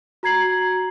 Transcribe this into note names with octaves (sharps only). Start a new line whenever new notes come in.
F#4 A#5 G#6 C7 F#7